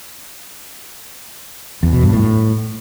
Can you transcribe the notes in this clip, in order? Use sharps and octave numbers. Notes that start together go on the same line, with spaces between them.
E2
B2
G2
A2